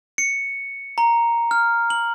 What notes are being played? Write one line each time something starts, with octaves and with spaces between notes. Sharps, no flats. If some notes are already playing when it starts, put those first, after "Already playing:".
C#7
A#5
F6
F#7